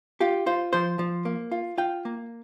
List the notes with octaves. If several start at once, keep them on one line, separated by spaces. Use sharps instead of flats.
F4 G4
F4 C5
F3 C5
F3
A#3
F4
F4 G5
A#3